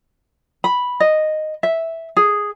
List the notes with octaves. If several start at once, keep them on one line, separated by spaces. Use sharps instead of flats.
B5
D#5
E5
G#4